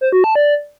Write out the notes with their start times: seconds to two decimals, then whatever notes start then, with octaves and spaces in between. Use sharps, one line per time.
0.01 C5
0.12 F#4
0.24 A5
0.35 D5